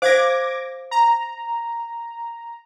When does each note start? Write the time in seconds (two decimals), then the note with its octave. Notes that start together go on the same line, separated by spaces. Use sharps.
0.02 C5 F5 D6 G#6 A#6
0.91 A#5